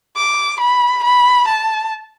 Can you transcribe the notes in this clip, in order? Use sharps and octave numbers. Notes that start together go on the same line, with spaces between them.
D6
B5
B5
A5